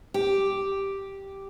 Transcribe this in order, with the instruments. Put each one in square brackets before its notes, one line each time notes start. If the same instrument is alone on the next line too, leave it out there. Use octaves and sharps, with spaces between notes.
[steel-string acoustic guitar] G4